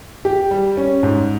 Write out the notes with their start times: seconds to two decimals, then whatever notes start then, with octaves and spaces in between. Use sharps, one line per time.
0.25 G4
0.51 G3
0.77 C#4
1.03 G#2